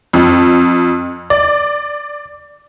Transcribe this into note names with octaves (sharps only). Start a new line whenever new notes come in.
F2
D5